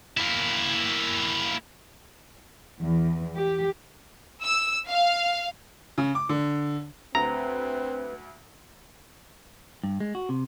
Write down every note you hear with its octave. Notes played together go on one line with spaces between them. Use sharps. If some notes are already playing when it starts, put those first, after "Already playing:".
A#3 E4
E2
G4
E6
F5
C#3
D6
D3
D2 C4 B4 A#5
G2
G#3
F#4
C3